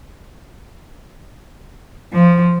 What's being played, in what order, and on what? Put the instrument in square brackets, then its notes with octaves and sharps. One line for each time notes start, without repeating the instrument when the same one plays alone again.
[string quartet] F3